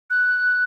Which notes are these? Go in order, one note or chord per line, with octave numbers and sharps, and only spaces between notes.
F#6